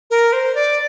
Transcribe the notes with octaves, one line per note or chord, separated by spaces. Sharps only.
A#4
C5
D5